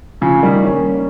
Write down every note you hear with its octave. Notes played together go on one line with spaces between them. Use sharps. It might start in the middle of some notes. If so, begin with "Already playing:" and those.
C#3 F3
D#3 G3
A#3 C#4